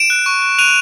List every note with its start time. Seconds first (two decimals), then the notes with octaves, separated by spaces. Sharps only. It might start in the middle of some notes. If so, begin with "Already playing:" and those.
Already playing: D7 E7
0.10 F#6
0.26 C#6
0.42 F#6
0.58 F#6 D#7 F7